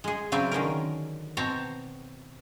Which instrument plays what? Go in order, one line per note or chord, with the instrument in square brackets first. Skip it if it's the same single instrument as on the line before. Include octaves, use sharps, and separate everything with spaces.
[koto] G#3 G#4
C#3 F#3 C4 B4 D5 E5
D3 D#3 C#4 A#4
B2 C4 C#5 A5 A#5